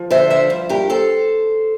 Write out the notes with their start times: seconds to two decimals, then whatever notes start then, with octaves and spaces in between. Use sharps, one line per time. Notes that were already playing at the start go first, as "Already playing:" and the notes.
Already playing: F3
0.11 D3 C5 E5
0.30 F3 C5 E5
0.50 G2
0.69 G2 G4 A#4
0.90 A4 C5